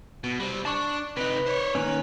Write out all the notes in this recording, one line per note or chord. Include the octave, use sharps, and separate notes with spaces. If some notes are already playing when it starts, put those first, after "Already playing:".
B2
G3 C4
D4 A5 C#6
C3 D#4 B4
C5 C#5
D#3 A#3 C#4 B4